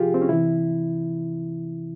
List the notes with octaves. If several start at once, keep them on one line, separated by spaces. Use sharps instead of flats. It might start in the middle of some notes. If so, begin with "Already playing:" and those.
Already playing: C3 F3 F4 G4 G#4
C4
C#4
C3 E3 E4